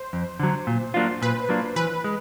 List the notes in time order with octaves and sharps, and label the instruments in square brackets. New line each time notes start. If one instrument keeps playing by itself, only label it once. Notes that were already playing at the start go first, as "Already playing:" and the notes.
Already playing: [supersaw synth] C5
[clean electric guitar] F2
D3 F#3
A#2
F#3 A#3 D4 F4
[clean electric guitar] A#2 [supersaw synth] B4
[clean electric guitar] F#3 A#3 D4 F4
[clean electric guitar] E3 [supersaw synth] B4
[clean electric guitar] G#3